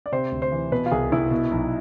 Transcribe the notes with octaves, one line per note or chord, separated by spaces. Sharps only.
D5
C3 C5
D2
C5
E3
B2 B4
F4
C2 G#4
C2 E4
B2
B1